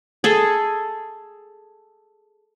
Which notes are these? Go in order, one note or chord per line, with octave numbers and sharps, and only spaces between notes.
G#4 A4